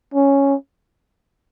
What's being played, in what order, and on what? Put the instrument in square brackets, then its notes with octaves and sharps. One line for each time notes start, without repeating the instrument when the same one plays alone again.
[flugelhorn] C#4